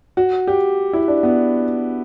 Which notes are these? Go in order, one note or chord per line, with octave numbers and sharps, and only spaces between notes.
F#4
G4
E4
D4
B3